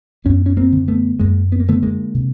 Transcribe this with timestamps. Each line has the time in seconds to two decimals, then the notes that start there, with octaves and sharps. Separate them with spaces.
0.25 F#2 B3 C#4
0.46 C#4
0.57 A#3 C4
0.72 D3
0.88 A3 B3
1.19 F#2 G#3 A#3
1.52 B3
1.60 A#3
1.68 D3 A3 B3
1.83 G#3 A#3
2.14 C3